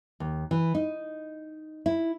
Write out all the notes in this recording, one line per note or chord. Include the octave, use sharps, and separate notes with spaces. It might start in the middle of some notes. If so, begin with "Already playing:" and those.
D#2
E3
D#4
E4